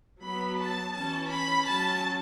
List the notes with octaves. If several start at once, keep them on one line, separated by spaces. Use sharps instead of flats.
F#3 B3 B5
A5
E3 C#4 A5
B5
F#3 C#4 A5